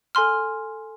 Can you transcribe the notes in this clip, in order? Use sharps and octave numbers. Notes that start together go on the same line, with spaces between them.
A4 G#5 C6 F6